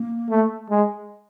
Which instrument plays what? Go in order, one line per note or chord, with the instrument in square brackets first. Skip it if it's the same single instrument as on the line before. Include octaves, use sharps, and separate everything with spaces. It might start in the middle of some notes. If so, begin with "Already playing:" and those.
Already playing: [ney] A#3
[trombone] A3
G#3